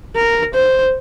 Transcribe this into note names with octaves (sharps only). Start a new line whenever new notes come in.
A#4
C5